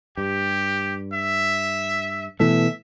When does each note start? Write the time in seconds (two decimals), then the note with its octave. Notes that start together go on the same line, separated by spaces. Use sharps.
0.17 G2 G4
1.13 E5
2.40 B2 E3 A3 E5